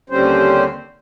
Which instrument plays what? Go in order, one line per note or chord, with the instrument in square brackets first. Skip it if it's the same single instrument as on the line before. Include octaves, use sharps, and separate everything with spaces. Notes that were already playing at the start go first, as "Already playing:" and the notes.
[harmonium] D#2 D3 G3 C4 C#4 C5